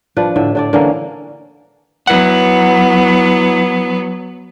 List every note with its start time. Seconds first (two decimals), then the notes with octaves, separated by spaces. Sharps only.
0.17 F3 D4 B4
0.36 A2 D3 E5
0.55 D3 D4 D5
0.73 D3 E3 A#3 C#4
2.07 F#3 B3 E4 F#5